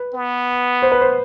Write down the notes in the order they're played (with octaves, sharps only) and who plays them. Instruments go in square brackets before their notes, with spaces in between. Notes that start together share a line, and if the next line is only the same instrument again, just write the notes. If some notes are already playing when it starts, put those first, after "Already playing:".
Already playing: [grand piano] B4
[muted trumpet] B3
[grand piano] C5
B4
C5